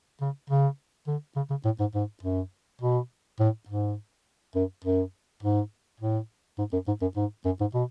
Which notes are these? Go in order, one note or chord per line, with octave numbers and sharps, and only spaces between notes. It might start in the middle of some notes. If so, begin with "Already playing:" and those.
C#3
C#3
D3
C#3
C#3
A2
G#2
G#2
F#2
B2
A2
G#2
F#2
F#2
G#2
A2
G#2
F#2
G#2
F#2
G#2
F#2
G#2
B2